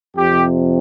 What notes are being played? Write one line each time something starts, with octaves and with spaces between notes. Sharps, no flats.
F2 C3 G4